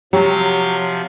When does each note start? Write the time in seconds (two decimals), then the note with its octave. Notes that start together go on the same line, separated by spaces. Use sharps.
0.13 C3 F3 F#3 G4